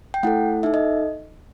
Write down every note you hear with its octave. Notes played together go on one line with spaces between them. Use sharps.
G5
A3 E4 A4 F#5
D#4 A4 E5
D#5